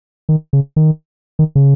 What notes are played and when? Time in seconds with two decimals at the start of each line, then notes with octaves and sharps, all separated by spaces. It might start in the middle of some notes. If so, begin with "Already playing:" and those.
0.29 D#3
0.53 C#3
0.76 D#3
1.39 D#3
1.55 C#3